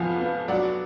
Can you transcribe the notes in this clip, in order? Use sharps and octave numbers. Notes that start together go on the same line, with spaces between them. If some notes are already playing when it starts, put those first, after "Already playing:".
Already playing: F2 F3 B3 F5 F#5 G#5
B3
F#3 D5 F#5